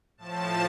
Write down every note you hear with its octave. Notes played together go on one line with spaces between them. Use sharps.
A2 F3 A5